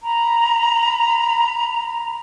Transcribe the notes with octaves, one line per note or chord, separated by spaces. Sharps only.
A#5 B5